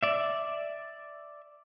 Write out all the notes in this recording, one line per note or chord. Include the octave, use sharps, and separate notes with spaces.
D5 E5